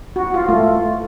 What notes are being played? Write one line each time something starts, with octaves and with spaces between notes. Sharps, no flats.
F#4
F4
A3